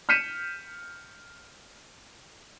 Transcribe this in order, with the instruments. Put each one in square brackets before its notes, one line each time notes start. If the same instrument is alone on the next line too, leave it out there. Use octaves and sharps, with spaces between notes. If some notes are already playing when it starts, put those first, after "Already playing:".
[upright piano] F6 G6 B6 C#7 D#7 E7